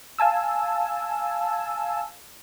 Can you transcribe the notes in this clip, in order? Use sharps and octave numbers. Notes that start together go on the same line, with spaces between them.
F5 G#5 A5 E6